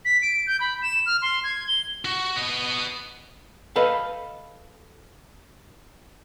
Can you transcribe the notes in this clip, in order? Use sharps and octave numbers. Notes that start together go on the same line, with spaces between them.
B6
D7
G6
B5
E7
F6
C6
G#6
G7
F#4
B3 D#5
A4 B4 D#5 F5